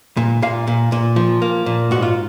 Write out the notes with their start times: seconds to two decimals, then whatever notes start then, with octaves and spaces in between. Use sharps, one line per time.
0.17 A#2
0.42 A#2 F5
0.67 A#2
0.92 A#2
1.16 F3
1.42 A#3
1.66 A#2
1.91 G#2 F#4
2.02 F4